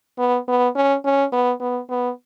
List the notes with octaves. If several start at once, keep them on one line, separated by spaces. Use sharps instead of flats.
B3
B3
C#4
C#4
B3
B3
B3